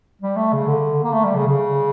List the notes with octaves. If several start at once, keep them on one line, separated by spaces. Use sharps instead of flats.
G3
A3
C#3
D3
A#3
A3
G3
C#3
C#3